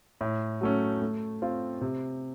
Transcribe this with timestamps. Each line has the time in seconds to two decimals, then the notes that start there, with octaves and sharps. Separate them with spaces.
0.21 A2
0.61 F#3 A3 C#4
1.02 A3
1.42 C4 F4
1.81 C3